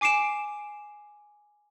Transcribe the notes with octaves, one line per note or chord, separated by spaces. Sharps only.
G#5 D6 C7 D7 E7